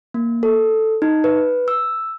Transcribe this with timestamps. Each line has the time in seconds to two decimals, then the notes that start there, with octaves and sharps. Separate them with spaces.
0.14 A#3
0.43 A4
1.02 D#4
1.24 B4
1.68 E6